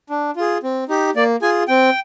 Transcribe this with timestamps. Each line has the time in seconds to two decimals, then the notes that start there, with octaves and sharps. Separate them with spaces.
0.10 D4
0.36 F4 G#4
0.63 C4
0.89 D#4 G4
1.15 A#3 D5
1.42 F4 G#4 G#5
1.68 C4 G5